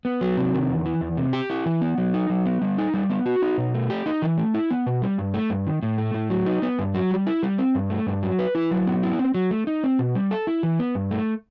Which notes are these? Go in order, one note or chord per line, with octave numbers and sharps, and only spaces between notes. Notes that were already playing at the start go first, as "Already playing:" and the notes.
B3
F#3
C3
D#3
E2
E3
E2
C3
G4
E4
E3
B3
F#3
D#4
F#3
B3
G3
D#4
G3
B3
F#4
D#4
B2
A3
G4
D#4
E3
A3
E4
B3
B2
G3
G2
A3
G2
D#3
A2
A3
A2
F#3
D#4
B3
G2
F#3
G3
E4
G3
C4
G2
A3
G2
F#3
B4
E4
F#3
B3
E4
C4
F#3
A3
D#4
C4
B2
G3
A4
E4
E3
B3
G2
A3